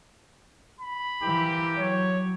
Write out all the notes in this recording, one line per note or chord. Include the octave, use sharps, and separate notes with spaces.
B5
E3 A#3 C4 G4
F#3 C#5